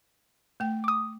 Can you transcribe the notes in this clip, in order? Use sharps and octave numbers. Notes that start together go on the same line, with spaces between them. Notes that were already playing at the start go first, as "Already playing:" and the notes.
A3 G5
D6 D#6